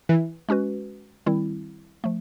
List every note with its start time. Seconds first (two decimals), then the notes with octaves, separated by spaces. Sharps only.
0.09 E3
0.49 G#3 C#4 F#4 B4
1.26 D#3 G3 C4 E4
2.04 F3 A3